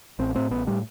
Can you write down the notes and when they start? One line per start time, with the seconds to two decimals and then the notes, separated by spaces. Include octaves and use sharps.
0.19 A1 C4
0.35 A2 C4
0.51 A1 B3
0.67 A2 G3